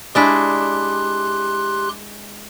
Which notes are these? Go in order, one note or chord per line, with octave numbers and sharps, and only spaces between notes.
G#3 D4 E4 G4 C6 F#6